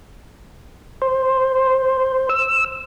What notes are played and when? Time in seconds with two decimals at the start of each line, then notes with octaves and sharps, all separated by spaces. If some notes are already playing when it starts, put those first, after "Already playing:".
1.02 C5
2.29 E6